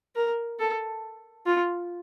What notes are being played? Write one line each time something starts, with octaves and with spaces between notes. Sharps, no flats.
A#4
A4
F4